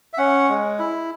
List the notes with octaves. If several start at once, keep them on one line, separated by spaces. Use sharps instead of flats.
E5
C#4 F#5
G#3
E4